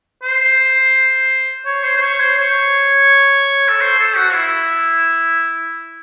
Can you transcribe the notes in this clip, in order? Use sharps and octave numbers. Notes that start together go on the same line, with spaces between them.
C5
C#5
C5
C5
C#5
C5
C#5
A4
C5
A4
F#4
E4